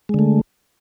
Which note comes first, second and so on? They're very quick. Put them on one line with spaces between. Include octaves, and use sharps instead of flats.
G#3 D3 A3